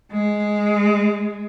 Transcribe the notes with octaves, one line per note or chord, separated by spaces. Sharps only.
G#3